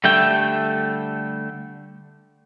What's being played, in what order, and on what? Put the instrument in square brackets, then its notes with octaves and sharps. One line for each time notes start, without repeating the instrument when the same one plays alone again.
[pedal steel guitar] D3 G3 A3 G5